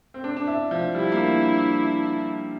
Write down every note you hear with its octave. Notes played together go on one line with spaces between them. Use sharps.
C4
D4
D4
E4
F3
G3 E4
A#3